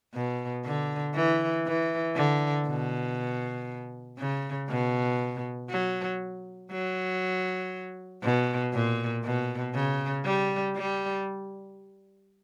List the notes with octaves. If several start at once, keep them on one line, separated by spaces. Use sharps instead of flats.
B2
D3
E3
E3
D3
B2
C#3
B2
F#3
F#3
B2
A#2
B2
C#3
G3
G3